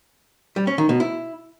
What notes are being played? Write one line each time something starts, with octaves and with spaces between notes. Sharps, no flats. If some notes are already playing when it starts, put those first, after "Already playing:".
G3
C#4
D#3
B2
E4